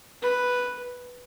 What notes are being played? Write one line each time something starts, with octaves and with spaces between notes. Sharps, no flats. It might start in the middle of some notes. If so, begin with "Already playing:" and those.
B4